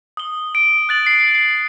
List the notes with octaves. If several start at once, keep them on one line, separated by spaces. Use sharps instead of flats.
D#6 G7
D7
F#6 A6 F#7
C7
C7